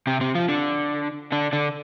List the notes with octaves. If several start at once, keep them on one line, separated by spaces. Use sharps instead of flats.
C3 C4
C3 C4
F3 F4
D3 D4
D3 D4
D3 D4